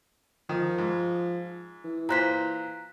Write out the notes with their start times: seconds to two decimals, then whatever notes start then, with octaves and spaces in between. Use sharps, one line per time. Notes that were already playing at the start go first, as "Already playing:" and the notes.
0.49 D#3 F3
0.78 G#2
1.85 E3
2.09 A#2 C5 A#5 F#6 B6